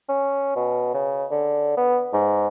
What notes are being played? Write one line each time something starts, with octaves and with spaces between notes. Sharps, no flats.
C#4
B2
C#3
D3
B3
G#2